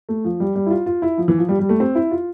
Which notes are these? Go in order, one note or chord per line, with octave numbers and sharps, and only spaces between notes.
A3
F3
G3
G3
E4
F4
F4
E4
F3
E3
F3
G3
G3
A3
C4
E4
F4